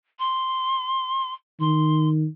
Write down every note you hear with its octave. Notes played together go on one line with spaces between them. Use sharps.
C6
D#3 C6